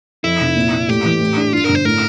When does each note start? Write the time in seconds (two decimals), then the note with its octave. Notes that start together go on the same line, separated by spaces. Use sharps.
0.24 F2 E4
0.40 F1
0.56 A#2
0.72 A#2
0.89 A2 G4
1.04 E3
1.21 A2
1.37 D4
1.53 G2 F4
1.64 G1 A#4
1.75 C5
1.85 A2 A#4